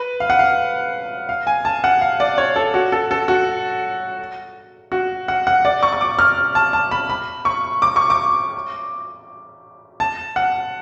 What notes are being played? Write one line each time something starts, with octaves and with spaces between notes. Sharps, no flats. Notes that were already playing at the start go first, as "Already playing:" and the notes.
Already playing: B4
F5
F#5
F5
F5
G#5
A5
F#5
F5
D5
C#5
A4
F#4
A4
A4
F#4
F#4
F#5
F#5
D5
C#6
C#6
D6
F6
A5
A5
B5
B5
C#6
D6
C#6
D6
A5
F#5